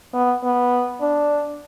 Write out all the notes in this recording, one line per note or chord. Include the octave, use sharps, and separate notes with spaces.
B3
B3
D4